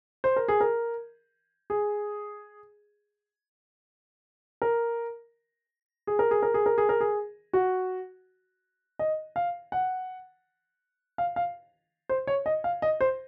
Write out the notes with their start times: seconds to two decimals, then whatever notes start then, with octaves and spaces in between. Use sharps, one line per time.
0.24 C5
0.36 A#4
0.48 G#4
0.61 A#4
1.70 G#4
4.62 A#4
6.07 G#4
6.19 A#4
6.31 G#4
6.43 A#4
6.54 G#4
6.66 A#4
6.78 G#4
6.89 A#4
7.01 G#4
7.53 F#4
8.99 D#5
9.36 F5
9.72 F#5
11.18 F5
11.36 F5
12.09 C5
12.27 C#5
12.46 D#5
12.64 F5
12.82 D#5
13.01 C5